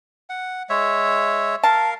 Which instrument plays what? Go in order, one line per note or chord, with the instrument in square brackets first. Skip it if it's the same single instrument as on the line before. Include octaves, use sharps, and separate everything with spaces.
[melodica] F#5
G#3 C#5 E5
[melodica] A#4 F5 [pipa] A5